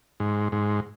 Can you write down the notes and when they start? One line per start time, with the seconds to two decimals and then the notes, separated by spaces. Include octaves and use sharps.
0.20 G#2
0.52 G#2